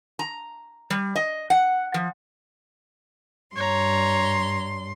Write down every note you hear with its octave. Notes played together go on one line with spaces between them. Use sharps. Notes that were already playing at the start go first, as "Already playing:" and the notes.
A#5
G3
D#5
F#5
F3
G2 C#5 A#5 C6